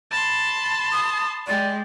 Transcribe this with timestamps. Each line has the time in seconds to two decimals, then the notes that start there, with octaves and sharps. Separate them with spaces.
0.11 A5 B5 C6
0.92 D#6
1.47 G#3 G4 D5